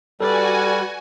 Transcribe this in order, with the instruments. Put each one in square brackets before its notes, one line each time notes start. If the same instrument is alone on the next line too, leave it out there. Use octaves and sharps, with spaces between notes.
[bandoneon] G3 [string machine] F#4 G#5 [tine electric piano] A4 [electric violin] B4 D5